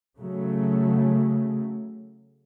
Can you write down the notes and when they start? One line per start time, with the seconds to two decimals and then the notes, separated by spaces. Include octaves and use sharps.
0.18 C#3 F#3 A3